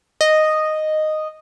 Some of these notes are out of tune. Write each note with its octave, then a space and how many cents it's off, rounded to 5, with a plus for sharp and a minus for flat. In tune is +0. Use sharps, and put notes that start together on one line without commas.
D#5 -5